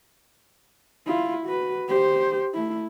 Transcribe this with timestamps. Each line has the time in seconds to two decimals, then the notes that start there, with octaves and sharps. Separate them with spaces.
1.06 E4 F4
1.46 F#4 B4
1.88 G4 C5
2.54 A3 E4